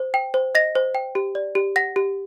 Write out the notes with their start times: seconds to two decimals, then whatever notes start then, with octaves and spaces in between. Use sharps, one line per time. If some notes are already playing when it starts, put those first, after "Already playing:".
Already playing: C5
0.14 G5
0.34 C5
0.55 D#5 A#6
0.75 C5
0.95 G5
1.15 G4
1.35 D5
1.55 G4
1.76 F#5 A#6
1.96 G4